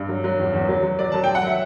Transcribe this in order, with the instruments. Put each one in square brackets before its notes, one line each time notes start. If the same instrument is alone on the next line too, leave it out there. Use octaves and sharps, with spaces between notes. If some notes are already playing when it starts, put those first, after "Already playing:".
Already playing: [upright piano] G2
F#3
F#3
E2
E2
F#3
F#3
F#3 D5
F#3 A5
F#3 G5
F#5
F#3 E5